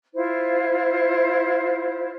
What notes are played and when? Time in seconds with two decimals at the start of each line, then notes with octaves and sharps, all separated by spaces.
0.14 E4 F4 C5